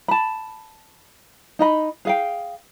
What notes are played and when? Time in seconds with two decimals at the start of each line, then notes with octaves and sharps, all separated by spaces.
0.08 A5 B5
1.59 D#4 D#5 B5
2.05 G#4 F5 G5